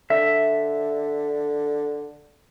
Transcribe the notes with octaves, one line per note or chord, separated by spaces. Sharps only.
D3 E5